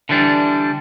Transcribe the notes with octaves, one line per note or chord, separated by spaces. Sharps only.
D3 E3 G3 D4